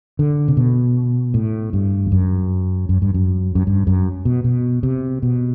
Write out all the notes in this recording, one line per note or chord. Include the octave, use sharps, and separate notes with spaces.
D3
C3
B2
A2
G2
E2
F#2
F#2
G2
F#2
F#2
G2
F#2
B2
B2
C3
B2